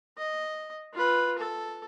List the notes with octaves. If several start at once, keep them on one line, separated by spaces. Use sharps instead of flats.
D#5
F4 B4
A4